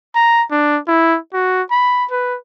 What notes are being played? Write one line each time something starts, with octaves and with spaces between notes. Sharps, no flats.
A#5
D4
E4
F#4
B5
B4